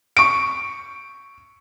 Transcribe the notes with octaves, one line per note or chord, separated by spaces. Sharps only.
C#6 D7